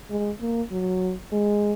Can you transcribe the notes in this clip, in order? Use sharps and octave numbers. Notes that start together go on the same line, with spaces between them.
G#3
A#3
F#3
G#3